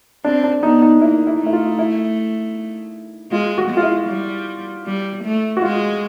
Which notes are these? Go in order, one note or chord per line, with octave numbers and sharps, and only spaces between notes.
C4 D4
D4
B3 D#4
D#4
A#3 E4
E4
A3
E4
F4
E4
G#3 F4
F#4
G#3
F4
E4
G3
G3
A3
F#4
G#3 F4